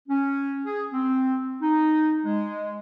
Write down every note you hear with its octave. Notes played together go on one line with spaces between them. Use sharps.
C#4
G#4
C4
D#4
G#3